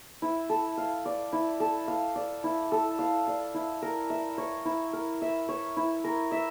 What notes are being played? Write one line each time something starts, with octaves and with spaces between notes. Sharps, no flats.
E4
A4
F5
D5
E4
A4
F5
D5
E4
A4
F5
D5
E4
A#4
E5
C#5
E4
A#4
E5
C#5
E4
A#4
E5